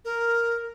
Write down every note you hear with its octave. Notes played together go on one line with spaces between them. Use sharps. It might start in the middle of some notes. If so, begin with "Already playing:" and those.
A#4